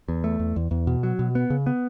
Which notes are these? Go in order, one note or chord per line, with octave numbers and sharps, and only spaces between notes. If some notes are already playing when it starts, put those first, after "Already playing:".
E2
A3
E2
E2
E2
B2
F#3
B2
B3
C#3
B3